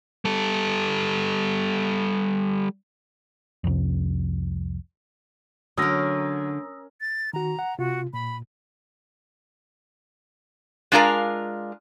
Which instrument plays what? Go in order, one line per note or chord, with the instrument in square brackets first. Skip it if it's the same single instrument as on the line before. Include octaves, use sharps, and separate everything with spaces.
[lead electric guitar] G3 A4
[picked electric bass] C2 F2
[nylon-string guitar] D3 A3 [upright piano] F#3 [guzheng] C#4 A#4 [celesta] D#6 E6 A#6
[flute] A6
[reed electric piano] D#3 F#4 [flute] A#5
[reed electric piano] F#5
[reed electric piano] C3 F4 [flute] F#4
[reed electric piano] A#2 [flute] B5
[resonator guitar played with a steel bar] G#3 D4 F4 G#4 A#4 F5